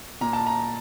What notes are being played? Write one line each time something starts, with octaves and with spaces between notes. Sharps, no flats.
A#2 A#5
A5
A#5